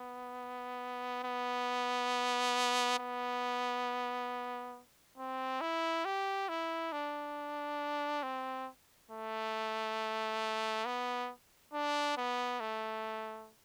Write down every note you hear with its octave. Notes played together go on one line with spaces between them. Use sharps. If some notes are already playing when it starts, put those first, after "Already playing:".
Already playing: B3
B3
B3
C4
E4
G4
E4
D4
C4
A3
B3
D4
B3
A3